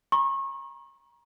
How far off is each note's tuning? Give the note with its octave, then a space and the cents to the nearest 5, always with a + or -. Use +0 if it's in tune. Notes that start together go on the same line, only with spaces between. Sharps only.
A#5 +30 C#6 -35